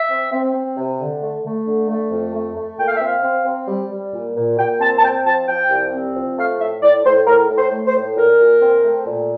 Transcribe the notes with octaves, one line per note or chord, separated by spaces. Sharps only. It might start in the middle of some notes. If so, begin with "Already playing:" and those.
Already playing: E5
C4
C4
C4
C3
D3
A3
A3
D3
A3
F2
A3
A3
A#2 G5
F5
E5
C4 F5
C4
C4
G3
G3
A#2
A#2
A#2 G5
C4 A5
A5
C4 G5
F3 A5
F3 G5
C2
C4
F3
A3 F5
A2 E5
A2 D5
A2 C5
A2 A#4
A2
C5
A3
C5
A2
A#2 A#4
A#2
C4
A3
A#2